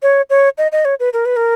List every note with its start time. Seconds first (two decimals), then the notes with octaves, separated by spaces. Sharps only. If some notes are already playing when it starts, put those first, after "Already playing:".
0.02 C#5
0.30 C#5
0.58 D#5
0.72 D#5
0.85 C#5
1.00 B4
1.13 A#4
1.26 B4
1.36 A#4